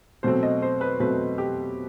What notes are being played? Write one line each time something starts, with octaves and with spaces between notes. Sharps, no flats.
B2 F#3 A3 C4 C5
D#5
C5
B4
B2 F#3 A3 C4 B4
G4